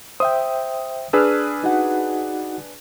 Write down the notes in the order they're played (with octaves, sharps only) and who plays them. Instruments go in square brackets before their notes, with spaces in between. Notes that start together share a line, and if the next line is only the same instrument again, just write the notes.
[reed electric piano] C5 E5 G5 [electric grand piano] D#6
[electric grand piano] D4 G#4 B4 [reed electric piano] E6 F6
[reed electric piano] D#4 F#4 F#5